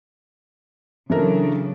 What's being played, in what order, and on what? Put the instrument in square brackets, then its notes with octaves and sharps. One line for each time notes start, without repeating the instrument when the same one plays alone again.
[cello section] C#3 F#3 D4 [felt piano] E3 A4 A#4